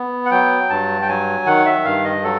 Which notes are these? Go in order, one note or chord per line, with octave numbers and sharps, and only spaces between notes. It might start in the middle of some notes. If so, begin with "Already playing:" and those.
Already playing: B3
F#5
F#3 G5
G2 A5
G5
F#3 G#5
D#3 F#5
E5
G2 F5
D#5
F#3 A4